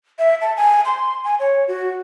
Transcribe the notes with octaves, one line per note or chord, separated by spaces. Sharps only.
E5
A5
G#5
C6
G#5
C#5
F#4